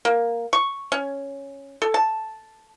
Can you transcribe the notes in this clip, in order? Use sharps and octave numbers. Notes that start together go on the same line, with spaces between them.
A#3
C#6
C#4
A4
A5